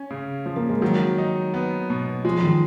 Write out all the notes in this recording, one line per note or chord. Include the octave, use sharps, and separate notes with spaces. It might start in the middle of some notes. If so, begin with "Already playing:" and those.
Already playing: C#4
C#3
F3
A#3
G#3
D#3 F#3
D#4
B3
B2
F3 G#3
D#3